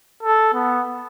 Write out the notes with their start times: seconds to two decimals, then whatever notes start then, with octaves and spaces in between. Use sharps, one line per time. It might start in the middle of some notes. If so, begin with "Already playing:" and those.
0.23 A4
0.54 B3